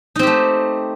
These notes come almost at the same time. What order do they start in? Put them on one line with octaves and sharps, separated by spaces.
D#4 C4 G4 A3